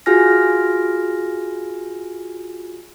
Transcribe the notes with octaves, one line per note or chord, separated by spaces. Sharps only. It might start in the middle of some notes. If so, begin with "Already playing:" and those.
F4 F#4 G#4 G#5 F6 A#6